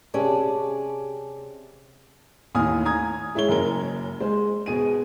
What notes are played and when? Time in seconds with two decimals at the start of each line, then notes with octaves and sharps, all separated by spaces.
0.14 C3 C#4 G4 G#4 D5 A5
2.55 A1 D#2 A2 G#5 D#6 F6
2.85 G#5 A#5 D#6 G#6
3.35 G#3 E4 G#4 C#5 G7
3.48 F#1 F#2 A#4 G7
4.20 G#3 C5
4.66 B2 G#4 D#7